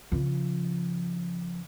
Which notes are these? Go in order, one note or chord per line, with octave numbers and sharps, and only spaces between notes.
C#3 F3